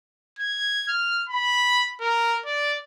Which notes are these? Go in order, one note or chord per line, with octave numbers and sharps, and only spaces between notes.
G#6
F6
B5
A#4
D5